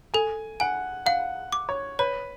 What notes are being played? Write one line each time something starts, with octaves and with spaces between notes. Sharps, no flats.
A4 G#5
F#5 G#5
F5 F#5
D6
C#5
B4 C#5